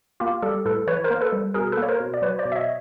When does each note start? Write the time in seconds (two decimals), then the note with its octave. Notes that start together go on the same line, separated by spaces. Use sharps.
0.20 A#3 F4 G4
0.42 G3 G4 A4
0.65 A2 A4 B4
0.87 E3 B4 C#5
1.04 A#4 C5
1.10 A#3
1.21 A4 B4
1.32 G3
1.54 B2 G#4 A#4
1.72 A#3 A4 B4
1.82 C#5
1.89 A#4 C5
2.00 B2
2.14 D5
2.22 F#3 B4 C#5
2.39 C5 D5
2.45 B2
2.52 E5
2.56 C#5 D#5